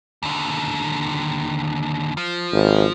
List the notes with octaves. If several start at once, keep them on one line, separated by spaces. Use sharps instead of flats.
D#2 D3
F3
G#1